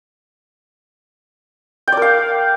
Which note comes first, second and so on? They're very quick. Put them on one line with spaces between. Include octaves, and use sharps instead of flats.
G5 D5 A#4 F5